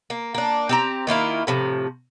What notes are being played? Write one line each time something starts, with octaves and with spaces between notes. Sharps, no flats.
A#3
A#3 D4
C4 G4 A#5
D#3 A#3 E4 F4
A2 C3 F3